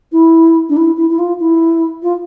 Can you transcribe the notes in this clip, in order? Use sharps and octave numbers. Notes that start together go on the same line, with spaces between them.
E4
D4
E4
E4
E4
F4
E4
F4